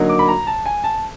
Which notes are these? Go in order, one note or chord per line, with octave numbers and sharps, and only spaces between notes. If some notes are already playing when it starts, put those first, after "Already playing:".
Already playing: D3 F#3 A#3 D#4
D6
B5
A#5
A5
G#5
A5